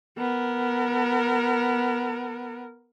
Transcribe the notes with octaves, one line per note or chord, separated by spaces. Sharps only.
B3 A#4